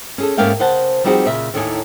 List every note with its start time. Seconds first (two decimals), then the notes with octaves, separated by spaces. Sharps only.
0.18 C#4 G#4 A4
0.37 G#2 A3 A#3 C#4 F5 G5
0.60 C#3 C5 F#5 A5
1.04 F3 G3 C4 D#4 F#4 G#4
1.26 A#2 C#3 E5
1.54 D#2 A2 A3 D4 D#4 G#5